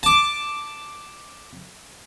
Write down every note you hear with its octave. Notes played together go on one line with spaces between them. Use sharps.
A5 D6